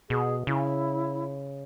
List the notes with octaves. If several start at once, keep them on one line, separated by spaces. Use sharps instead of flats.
B2 G#4
C#3 E4